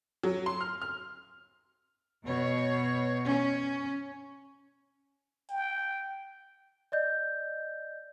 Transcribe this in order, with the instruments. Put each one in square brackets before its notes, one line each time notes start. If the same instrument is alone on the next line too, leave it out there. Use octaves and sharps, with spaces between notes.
[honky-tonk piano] F#3
C6
F6
F6
[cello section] B2 C#5
C#4
[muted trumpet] G5
[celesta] D5 D#5 G6